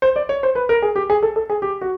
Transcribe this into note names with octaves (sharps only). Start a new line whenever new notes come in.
C5
D5
C#5
C5
B4
A#4
G#4
G4
G#4
A4
A4
G#4
G4
F#4